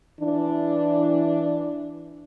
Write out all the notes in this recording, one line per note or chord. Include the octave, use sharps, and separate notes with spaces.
E3 D4